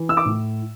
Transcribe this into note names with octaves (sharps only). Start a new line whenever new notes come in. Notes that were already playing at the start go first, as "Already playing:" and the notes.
Already playing: E3
E6
D6
A2